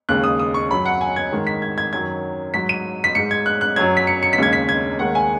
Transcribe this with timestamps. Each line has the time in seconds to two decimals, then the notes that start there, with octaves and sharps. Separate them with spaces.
0.09 D#2 C#3 G#3 F#6
0.24 D#6
0.39 D#6
0.54 C#6
0.70 F#2 F#3 B5
0.85 F#5
1.01 G#5
1.16 G#6
1.32 G#2 D#3 G#3
1.47 B6
1.62 G#6
1.78 G#6
1.93 F#2 D#3 F#3 G#6
2.54 G#2 F#3 B6
2.69 D#7
3.04 B6
3.15 G#2 G#3 C#7
3.31 G#6
3.46 F#6
3.61 F#6
3.76 F#2 F#3 G#6
3.97 B6
4.07 C#7
4.23 C#7
4.33 B6
4.38 D#2 C#3 G#3 G#6
4.53 B6
4.69 G#6
4.99 D#2 D#3 G#3 F#5
5.15 G#5